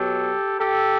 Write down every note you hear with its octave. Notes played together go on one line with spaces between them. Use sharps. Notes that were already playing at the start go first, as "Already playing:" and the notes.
Already playing: B2 F#3 G4 A4
G4 A4